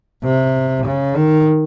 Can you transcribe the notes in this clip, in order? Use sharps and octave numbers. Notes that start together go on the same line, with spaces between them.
C3
C#3
D#3